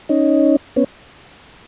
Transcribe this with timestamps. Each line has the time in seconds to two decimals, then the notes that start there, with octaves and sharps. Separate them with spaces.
0.09 C#4 D#4
0.76 B3 C#4